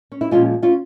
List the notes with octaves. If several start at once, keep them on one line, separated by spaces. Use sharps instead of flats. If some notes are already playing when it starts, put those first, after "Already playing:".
C#4
E4
A#2 F3 G#3 C#4 F4
C#4 F4